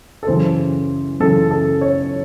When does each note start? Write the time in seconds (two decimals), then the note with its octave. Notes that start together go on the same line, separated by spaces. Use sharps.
0.23 A4
0.27 F#2 C#3 E3 C5
1.20 F#2 C#3 E3 A4
1.51 A4
1.81 C#5